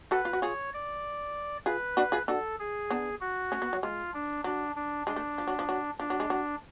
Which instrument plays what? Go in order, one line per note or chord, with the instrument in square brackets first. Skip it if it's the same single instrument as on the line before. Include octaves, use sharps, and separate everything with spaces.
[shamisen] F#4 A4 [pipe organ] B4
[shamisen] F4
F#4
[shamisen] F4 G#4 [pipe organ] C#5
[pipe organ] D5
[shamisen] F4 G#4 [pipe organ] B4
[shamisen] D4 F#4
F4 G#4
[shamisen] D4 F#4 [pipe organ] A4
[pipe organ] G#4
[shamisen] B3 D4
[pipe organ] F#4
[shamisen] A3 C#4
B3
F#3
[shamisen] G#3 [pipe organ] F4
[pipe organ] D4
[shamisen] F#3 [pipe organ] D4
[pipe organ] D4
[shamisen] G#3 [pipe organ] D4
[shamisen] A3
F3
F#3
F3
F#3
[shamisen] F3 [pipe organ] D4
[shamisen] F#3
G#3
F#3